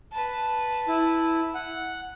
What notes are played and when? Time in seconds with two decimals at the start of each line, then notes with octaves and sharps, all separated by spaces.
0.12 B4 A5
0.88 E4
1.54 F#5